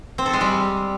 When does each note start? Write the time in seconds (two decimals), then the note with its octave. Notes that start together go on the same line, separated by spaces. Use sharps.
0.18 C4
0.26 A4
0.33 G#3
0.41 G3